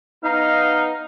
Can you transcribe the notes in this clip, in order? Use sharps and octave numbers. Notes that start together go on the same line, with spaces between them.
B3 D#4 F5